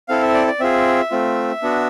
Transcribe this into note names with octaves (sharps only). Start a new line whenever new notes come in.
C4 E4 A4 F5
E5
D5
D5
C4 F4 G#4 E5
A3 C4 F4
B3 D4 F#4